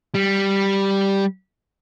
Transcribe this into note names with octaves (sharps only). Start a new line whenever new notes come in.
G3